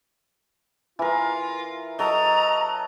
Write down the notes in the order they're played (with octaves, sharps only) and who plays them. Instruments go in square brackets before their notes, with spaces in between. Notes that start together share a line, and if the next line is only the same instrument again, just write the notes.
[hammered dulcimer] E3 A#4 [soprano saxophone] F4
[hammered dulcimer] F#3 A4 [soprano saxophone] D#5 [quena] A#5